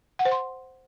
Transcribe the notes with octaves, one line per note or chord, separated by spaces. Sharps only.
F#5
C5
C6